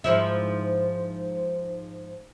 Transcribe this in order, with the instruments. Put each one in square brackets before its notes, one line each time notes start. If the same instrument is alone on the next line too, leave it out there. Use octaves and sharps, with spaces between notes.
[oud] G#2 F3 E4